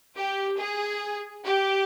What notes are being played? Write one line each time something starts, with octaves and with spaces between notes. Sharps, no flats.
G4
G#4
G4